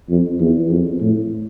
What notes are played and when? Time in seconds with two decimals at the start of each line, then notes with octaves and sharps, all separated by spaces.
0.09 F2
0.40 E2
0.70 F2
1.01 A2